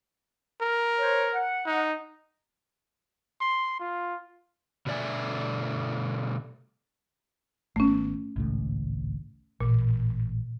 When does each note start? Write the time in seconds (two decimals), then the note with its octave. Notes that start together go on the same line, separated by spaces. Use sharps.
0.61 A#4
0.99 C5 C#5
1.33 F#5
1.66 D#4
3.41 C6
3.80 F4
4.86 B2 D3 A3 D5 E5 G#5
7.76 G#1 A3 B3 C#4
8.36 G#1 C#2 A2
9.61 A1 A#2